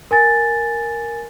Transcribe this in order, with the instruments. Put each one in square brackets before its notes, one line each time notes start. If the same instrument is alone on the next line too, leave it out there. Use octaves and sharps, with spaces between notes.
[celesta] A#4 G#5 A6